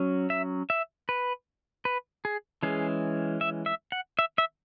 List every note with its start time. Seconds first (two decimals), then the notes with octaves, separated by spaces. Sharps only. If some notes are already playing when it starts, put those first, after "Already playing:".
Already playing: F#3 C#4
0.30 E5
0.70 E5
1.09 B4
1.85 B4
2.25 G#4
2.63 E3 G#3 C#4 G#4
3.41 E5
3.66 E5
3.92 F#5
4.19 E5
4.38 E5